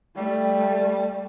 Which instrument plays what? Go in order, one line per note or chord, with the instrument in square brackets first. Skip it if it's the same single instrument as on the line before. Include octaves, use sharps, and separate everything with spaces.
[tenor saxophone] G3 [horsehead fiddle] A3